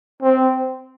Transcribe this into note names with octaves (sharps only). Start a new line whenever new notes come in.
C4